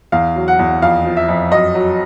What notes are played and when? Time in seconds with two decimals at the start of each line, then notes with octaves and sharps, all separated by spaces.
0.12 E2 F5
0.36 F#3
0.48 F#5
0.59 E2
0.82 F2 F5
1.05 F3
1.17 E5
1.28 F2
1.51 F#2 D#5
1.75 F#3